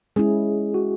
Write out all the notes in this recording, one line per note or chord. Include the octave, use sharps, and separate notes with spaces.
G#3 C#4 E4 G#4
F#4